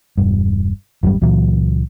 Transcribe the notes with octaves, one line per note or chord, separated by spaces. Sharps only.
E1 G2
G#1 F#2 C3 G3
C#2 A#2 E3 F#3